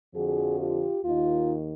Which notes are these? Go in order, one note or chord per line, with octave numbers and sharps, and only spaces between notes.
F2 D3 F3 F#4 G#4
F4 G4
D#2 D#3 D#4 F4